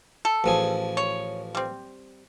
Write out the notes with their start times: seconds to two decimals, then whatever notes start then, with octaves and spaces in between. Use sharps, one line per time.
0.25 A4
0.44 A1 F3 G#4
0.97 C#5
1.55 G3 C4